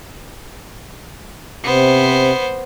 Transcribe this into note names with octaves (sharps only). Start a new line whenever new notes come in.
C3 B3 C5